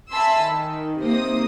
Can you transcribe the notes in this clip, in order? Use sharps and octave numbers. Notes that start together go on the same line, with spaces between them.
E5 G#5 A5 B5 C6 E6
D#3
C3 A#3 D#4 C5 D#6